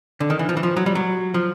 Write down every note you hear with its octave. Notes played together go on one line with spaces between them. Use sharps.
D3
D#3
E3
F3
E3
F3
F#3
G3
F#3
F3